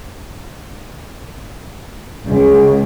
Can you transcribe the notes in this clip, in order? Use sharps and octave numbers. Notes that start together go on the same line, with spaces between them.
C#2